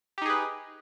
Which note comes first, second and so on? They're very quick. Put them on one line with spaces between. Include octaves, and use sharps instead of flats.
G4 D#4 G#4 B4